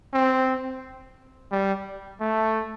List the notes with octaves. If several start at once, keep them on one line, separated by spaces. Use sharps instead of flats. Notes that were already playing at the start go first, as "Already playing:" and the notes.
C4
G3
A3